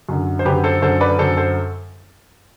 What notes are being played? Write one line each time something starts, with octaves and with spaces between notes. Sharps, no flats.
F#2 D3
C5
F#2 D3 G4 B4
A4 C5
F#2 D3 A4 C5
B4 D5
F#2 D3 A4 C5
A4 C5